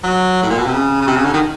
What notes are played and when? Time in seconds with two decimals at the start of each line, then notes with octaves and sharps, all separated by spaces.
0.04 F#3
0.43 A2
0.50 A#2
0.58 B2
0.65 C3
0.73 C#3
1.01 C#3
1.07 C3
1.16 C#3
1.25 D3
1.34 D#3